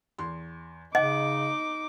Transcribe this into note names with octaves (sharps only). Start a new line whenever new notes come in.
E2 C6
C#3 D#4 D#5 F#5 D6